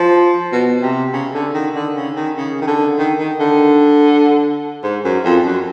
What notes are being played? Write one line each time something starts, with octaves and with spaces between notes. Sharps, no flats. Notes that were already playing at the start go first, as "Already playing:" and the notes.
Already playing: F3
B2
C3
C#3
D3
D#3
D3
C#3
D#3
C#3
D#3
D3
D#3
D#3
D3
G#2
F#2
F2
F#2